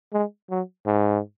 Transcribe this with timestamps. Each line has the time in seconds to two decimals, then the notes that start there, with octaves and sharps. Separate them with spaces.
0.13 G#3
0.50 F#3
0.86 G#2